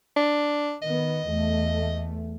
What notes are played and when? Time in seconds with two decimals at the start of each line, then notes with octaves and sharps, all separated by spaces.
0.16 D4
0.82 D#3 B3 D#5
1.28 E2 A3